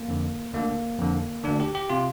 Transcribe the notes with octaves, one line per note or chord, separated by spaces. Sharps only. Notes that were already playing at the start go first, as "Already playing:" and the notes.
Already playing: A#3
F2 D3
D2 D3 A#3
F2 D3
D2 D3 D4
G4
G4
C3 F4